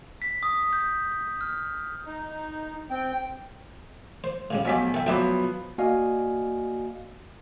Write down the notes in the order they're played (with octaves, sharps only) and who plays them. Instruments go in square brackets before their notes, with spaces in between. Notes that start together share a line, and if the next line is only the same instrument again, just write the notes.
[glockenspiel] B6
D#6
G6
F6
[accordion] D#4
C4 G5
[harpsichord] C5
A2 C#3 G3
[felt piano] B1 G#5 B6 [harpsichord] F3 F#3 G4
[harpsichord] E4 A4 [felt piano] G5
[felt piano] F3 F#3 B3 [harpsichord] D5 E5 G5
[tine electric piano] A#3 F#4 D5 D#5 F5 G#5